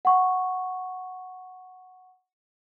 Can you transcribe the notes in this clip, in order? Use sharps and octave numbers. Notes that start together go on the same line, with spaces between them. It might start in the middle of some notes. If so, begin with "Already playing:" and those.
F#5 C#6